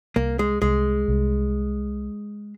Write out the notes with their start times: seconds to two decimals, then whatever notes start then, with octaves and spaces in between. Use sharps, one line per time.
0.16 C2 A#3
0.39 G#3
0.62 C2 G#3
1.08 C2